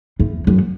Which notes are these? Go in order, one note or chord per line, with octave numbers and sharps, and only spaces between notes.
E2
F#2